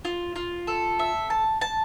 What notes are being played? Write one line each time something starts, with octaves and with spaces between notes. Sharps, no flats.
F4
F4
A4
E5
A5
A5